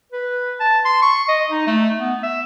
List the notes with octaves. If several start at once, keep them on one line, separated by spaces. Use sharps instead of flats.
B4
A5
C6
C#6
D#5
D#4
A3
B3
E5